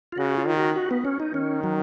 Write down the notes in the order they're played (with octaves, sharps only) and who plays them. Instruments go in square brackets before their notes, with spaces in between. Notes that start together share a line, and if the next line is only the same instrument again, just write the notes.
[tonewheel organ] F4
[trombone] C#3 [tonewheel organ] F#4
[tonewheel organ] F4
[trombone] D#3
[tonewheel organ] F#4
F#4
B3
C#4
D#4
[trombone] D#3 [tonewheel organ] C#4
[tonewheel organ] F#3